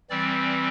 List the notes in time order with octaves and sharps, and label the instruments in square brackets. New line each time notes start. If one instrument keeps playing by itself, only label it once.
[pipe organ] E3 G3 C4 D5